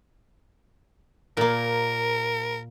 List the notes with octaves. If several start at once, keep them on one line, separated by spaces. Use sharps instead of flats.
A#2 A#3 A#4